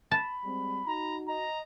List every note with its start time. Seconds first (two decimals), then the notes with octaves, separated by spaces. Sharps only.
0.11 A5 B5
0.45 G3 G#3 C4
0.87 D#4 F#4 A#5
1.28 D#5 A#5